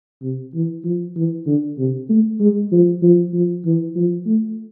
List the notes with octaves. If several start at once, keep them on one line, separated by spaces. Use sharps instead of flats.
C3
E3
F3
E3
D3
C3
A3
G#3
F3
F3
F3
E3
F3
A3